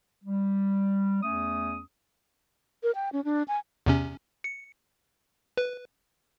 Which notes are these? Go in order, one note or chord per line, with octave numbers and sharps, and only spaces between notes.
G3
E2 A3 C#4 D#6
A#4
G5
C#4
D4
G#5
E2 C3 C#4
C#7
B4